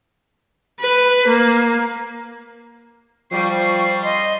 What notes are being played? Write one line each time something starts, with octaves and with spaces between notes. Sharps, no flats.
B4
A#3
F3 G3 C#6 C7
D#5 C6